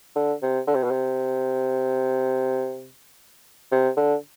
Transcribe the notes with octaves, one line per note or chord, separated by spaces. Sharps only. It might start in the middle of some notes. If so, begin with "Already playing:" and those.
D3
C3
D3
C3
B2
C3
C3
D3